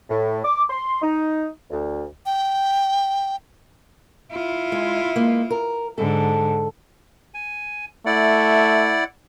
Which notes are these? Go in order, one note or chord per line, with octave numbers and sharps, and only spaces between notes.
A2
D6
C6
D#4
D2
G5
E4 F4
G#3
G#3 A#3
A#4
G#2 D3 A4
G#5
A3 E4 D5 F#5